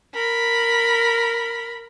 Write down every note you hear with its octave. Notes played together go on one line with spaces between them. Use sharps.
A#4 B5